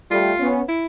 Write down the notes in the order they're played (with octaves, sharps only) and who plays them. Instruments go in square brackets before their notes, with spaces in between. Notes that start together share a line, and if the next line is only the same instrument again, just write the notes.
[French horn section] G3 A3 [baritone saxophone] F4
[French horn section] B3 C#4
[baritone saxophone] E4